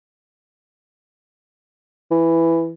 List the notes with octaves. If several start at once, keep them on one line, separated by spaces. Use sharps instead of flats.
E3